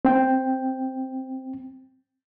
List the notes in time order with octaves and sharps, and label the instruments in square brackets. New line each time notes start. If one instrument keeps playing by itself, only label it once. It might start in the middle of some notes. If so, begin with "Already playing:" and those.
[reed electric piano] C4 G5